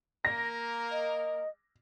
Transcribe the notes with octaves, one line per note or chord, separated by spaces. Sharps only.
A#3 A#4 A#6
D#5